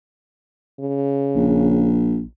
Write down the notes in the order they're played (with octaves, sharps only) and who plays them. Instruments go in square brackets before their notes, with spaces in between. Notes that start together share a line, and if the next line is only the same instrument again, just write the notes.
[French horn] C#3
[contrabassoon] A#1